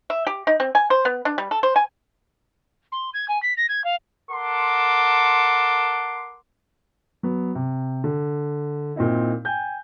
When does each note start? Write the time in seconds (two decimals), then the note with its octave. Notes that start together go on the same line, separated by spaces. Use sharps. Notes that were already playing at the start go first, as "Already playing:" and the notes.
0.10 E5
0.27 G4
0.47 D#4
0.60 C4
0.75 G#5
0.90 C5
1.05 B3
1.25 D4
1.38 G3
1.51 A4
1.63 C5
1.76 G#5
2.92 C6
3.14 G#6
3.28 G#5
3.42 B6
3.57 A#6
3.69 G#6
3.84 F5
4.31 A4 A#4 F#5 A5 C6 D6
7.23 F#3 B3
7.55 C3
8.04 D3
8.96 A#2 C4 D#4 E4
9.45 G5 G#5 G6